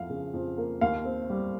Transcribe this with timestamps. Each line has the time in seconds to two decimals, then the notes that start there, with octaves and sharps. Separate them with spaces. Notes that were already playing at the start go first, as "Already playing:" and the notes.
Already playing: F2 F3 F5
0.10 C#3
0.34 F2
0.58 A#3
0.81 D#2 F5
1.05 C4
1.30 G3